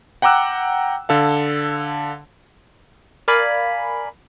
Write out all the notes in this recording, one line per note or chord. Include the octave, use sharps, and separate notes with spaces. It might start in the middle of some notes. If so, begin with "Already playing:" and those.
F#5 G5 A#5 D6 E6 F#6
D3 A4 F5
A#4 D5 F5 G#5 B5